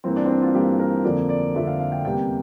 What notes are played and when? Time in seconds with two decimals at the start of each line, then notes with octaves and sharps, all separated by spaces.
0.04 G2 E3 A#3 C4
0.16 D4
0.26 C4
0.29 D4
0.42 F4
0.54 G2 E3 A#3 G4
0.79 A#4
1.04 F2 D3 F3 A#3 D5
1.29 D5
1.55 F2 D3 F3 A#3 E5
1.67 F5
1.80 F5
1.92 G5
2.05 E2 C3 G3 A#3 G5